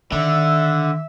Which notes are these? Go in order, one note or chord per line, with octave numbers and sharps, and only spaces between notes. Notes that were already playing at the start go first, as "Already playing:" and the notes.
D3 D#3 E5